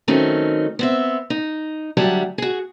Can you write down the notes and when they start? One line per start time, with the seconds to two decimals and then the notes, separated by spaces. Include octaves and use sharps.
0.08 D#3 F#3 A3 C4 C#4 D#4
0.79 B3 C4 E5
1.30 D#4
1.97 D2 F#3 G3 E5 F#5 A5
2.38 F#4 G#4